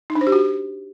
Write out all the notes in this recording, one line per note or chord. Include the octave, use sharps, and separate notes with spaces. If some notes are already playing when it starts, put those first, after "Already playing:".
D#4
D4
C5
G4
F#4